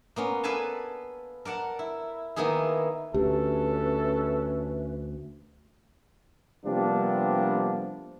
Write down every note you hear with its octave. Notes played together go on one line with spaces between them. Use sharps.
A#3 B3 C#4
A4 B4 D5 F5 G#5 A5
A#4 D5 F#5 A5
E4
D#3 A#3 B3 E4 G#4
D2 C#4 G4 A4 B4 E5
C3 F3 G3 A#3 B3 D4